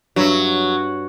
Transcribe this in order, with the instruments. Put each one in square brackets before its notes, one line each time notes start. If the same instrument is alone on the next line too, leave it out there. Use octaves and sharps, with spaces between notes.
[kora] G2 E5 [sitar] F#3